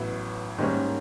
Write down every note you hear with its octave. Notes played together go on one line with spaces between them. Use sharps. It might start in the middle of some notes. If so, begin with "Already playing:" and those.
Already playing: A1 A2 F#3 B3
G#2 D#3 G3 A#3 C#4